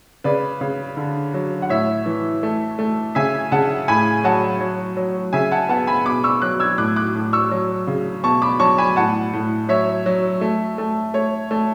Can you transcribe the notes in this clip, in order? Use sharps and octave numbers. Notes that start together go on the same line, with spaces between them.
C#3 B4 D5
C#3
D3
F#3
F#5
A2 C#5 E5
E3
A3
A3
C#3 E5 G#5
C#3 F#5 A5
A2 G#5 B5
F#3 F#5 A5
F#3
F#3
C#3 E5 G#5
F#5 A5
B3 F#5 A5
G#5 B5
B2 B5 D6
C#6 E6
F#3 D6 F#6
E6 G#6
A2 D6 F#6
D6 F#6
A2
C#6 E6
F#3
C#3
B2 A5 C#6
B5 D6
F#3 A5 C#6
G#5 B5
A2 F#5 A5
A2
F#3 C#5 E5
F#3
A3
A3
A3 C#5
A3